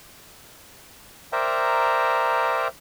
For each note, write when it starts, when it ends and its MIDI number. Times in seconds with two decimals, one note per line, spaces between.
1.33 2.68 70
1.33 2.68 72
1.33 2.68 74
1.33 2.68 76
1.33 2.68 79
1.33 2.68 82